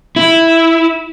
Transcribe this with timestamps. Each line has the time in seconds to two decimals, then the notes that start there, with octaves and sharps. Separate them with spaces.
0.16 E4